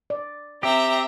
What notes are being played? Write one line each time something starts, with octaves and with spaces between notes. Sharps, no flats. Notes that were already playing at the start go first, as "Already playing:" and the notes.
D5
C4 G4 E5 A#5